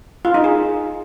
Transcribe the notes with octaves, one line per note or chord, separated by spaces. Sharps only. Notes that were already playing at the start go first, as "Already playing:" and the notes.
F4
D#4
G#4